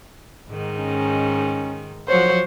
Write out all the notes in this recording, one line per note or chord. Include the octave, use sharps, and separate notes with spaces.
G#2 D#3
C#4
F3 F#3 F#4 C5 C#5